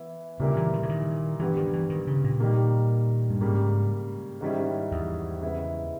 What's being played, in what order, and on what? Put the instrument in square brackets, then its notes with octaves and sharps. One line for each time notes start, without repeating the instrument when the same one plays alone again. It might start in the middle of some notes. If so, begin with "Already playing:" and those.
Already playing: [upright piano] E3 B3 E4
[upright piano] A#2 G3 A#3 E4 A#4 [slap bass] C#3
[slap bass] E3
D#3
C#3
D#3
[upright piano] G2 G3 B3 [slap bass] E3
[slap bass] D#3
E3
D#3
C#3
A#2
[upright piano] D#3 G3 A#3
[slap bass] G2
[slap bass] G#2 [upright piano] C#3 G3 A#3
[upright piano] G#2 D#3 G3 C#4 E4
[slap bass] E2
[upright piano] C#3 G#3 B3 E4